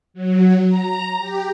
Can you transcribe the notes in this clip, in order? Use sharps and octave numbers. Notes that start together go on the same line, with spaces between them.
F#3
A#5
G4